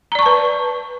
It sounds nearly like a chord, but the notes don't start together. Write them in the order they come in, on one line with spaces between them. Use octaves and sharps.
A#5 D5 C#6 A5 B4